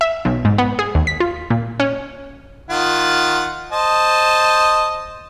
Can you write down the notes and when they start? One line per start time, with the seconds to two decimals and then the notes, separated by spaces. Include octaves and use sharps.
0.01 E5
0.25 B1
0.45 G#2
0.58 B3
0.79 G#4
0.95 D#2
1.07 B6
1.20 F4
1.50 A#2
1.80 C#4
2.70 D#3 F4 F#5
3.72 C5 D#5 A5